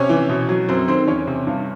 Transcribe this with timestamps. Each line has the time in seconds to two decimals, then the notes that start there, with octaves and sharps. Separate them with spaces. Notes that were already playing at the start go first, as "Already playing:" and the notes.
Already playing: C3 C#4 C#5
0.09 E3
0.29 B2
0.49 F#3
0.69 F#2 C4 C5
0.88 D#3 C4 C5
1.07 E2 C#4 C#5
1.27 C3
1.47 G2